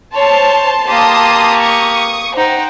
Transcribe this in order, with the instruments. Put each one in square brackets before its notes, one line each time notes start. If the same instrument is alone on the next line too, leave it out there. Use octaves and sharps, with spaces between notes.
[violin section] C5 A5 C6 [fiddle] C#5
[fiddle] A#3 G4 [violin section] A5 C6 D#6
[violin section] C#6 D#6
[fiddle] D#4 [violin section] C5 F#5 G5